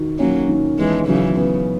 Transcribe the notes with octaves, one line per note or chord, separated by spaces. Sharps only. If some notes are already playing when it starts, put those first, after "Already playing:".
Already playing: D#3 F#4
F#3 A#3 C#4
D#3
E3 G#3 B3
C#3 E3 F#3
C#3 B3